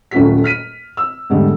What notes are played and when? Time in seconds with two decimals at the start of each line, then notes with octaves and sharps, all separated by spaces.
0.11 D#1 F#2 A3 F4 F#4 B6
0.44 F6 B6 D#7
0.97 E6
1.29 E2 G#2 D3 G3 A3